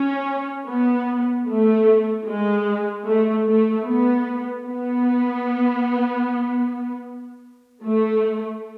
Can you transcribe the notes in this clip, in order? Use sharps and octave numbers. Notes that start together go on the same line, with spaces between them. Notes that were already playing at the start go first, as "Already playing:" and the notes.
Already playing: C#4
B3
A3
G#3
A3
A3
B3
B3
A3